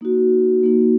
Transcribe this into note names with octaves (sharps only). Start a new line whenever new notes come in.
A#3 D#4 F#4
A#3 D#4 F#4